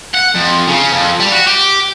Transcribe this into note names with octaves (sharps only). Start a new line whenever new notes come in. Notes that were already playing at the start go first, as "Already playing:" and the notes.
F#5
F2
C#3
F2
G3
F#4
G4